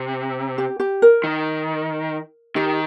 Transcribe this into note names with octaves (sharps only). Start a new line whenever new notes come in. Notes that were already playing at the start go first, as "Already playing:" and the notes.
Already playing: C3
G4
G4
A#4
D#3
D#3 G4